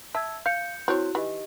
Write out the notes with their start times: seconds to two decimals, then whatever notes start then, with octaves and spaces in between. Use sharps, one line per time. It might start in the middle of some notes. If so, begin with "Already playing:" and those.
0.15 E5 A5 E6 G#6
0.46 F5 G6 C#7
0.88 C4 E4 F#4 C#5 F#6
1.15 E3 D#4 G4 D#5